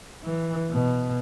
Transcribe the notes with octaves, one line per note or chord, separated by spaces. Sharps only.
E3
B2